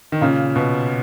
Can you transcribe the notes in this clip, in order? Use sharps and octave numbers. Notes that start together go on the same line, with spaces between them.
D#3
A#2 C#3
B2